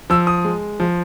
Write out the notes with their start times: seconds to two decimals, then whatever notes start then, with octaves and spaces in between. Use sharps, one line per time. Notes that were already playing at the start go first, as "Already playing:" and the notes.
0.10 F3 E6
0.27 D#6
0.45 G#3
0.80 F3